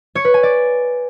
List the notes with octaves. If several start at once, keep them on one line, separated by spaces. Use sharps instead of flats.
C#5
B4
G#5
D5